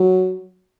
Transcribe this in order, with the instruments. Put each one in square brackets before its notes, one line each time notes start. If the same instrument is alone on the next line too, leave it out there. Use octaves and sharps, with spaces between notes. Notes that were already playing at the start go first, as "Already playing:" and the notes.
Already playing: [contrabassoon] F#3